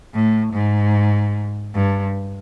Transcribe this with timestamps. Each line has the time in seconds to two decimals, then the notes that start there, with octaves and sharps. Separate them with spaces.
0.14 A2
0.54 G#2
1.75 G2